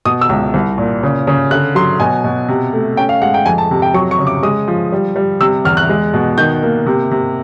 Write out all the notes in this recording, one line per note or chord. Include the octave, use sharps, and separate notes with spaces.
B2 D#6
E6
C#2
C2
A#2
C#3
C#3
D3 F#6
F#3 C6
B2 G#5
B2
C3
A3
C#4 G5
F5
G#3 F#5
G5
F2 G#5
A5
C3
G5
F#3 C#6
C#6
C#3
D6
G#3 D#6
F3
G3
G3
C3 E6
E2 F6
F#6
G#3
B2
D#3 G6
A#3
C3
C3